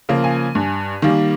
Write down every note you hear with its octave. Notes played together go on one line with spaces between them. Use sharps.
C#3 F3 A#3
G#5
G2
D#3 G3 A#3